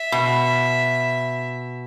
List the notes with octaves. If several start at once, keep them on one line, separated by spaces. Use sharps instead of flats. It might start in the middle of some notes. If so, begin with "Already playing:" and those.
Already playing: E5
B2